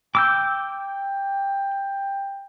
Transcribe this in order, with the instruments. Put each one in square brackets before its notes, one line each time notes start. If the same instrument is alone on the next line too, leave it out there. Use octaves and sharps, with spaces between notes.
[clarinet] G5 [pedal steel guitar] D6 E6 G6